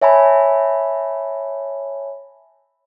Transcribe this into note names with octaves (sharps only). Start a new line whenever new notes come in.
C#5 E5 G#5 A5 B5